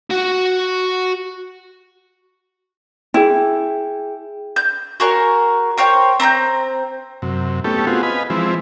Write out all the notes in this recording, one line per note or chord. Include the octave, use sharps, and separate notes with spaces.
F#4 F#5
E4 G#4 G5
G6
F#4 G#4 A#4 C#5
A#4 C5 C#5 G5
C4 A#5 B5 G6
F#2 C3
A3 B3 C#4 E4 G4 A4
B3 C4 F4 F#4 G#4
B4 D#5 F5 G#5 B5
E3 F3 G#3 C4 E4